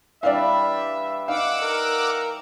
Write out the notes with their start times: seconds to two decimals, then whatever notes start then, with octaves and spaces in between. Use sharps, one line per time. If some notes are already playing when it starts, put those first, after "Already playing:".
0.23 E3 G3 D4 D5 E5 F5
1.28 D#4 F5 F#5 D6 E6
1.62 A#4